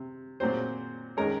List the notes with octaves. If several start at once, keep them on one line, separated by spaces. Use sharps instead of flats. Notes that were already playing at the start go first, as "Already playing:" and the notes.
Already playing: C3
A#2 F#3 C4 C5
D#3 G#3 C#4 A#4